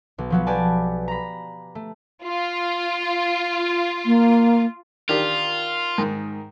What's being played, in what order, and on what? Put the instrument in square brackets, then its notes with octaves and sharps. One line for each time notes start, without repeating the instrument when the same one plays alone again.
[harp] B1
F3 F#3 B3
G4 B4 D5 G#5 A5
A#5 B5
A3
[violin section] F4
[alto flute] A#3
[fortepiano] D#3 D4 G4 [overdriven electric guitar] F4
[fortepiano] G#2 D#3